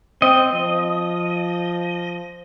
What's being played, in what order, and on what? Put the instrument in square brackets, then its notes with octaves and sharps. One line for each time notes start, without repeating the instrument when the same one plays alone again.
[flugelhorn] C4 [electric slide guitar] D#5
[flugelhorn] F3